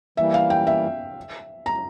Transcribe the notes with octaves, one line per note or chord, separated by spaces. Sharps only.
E3 G3 A#3 E5
F5
G5
E5
A#5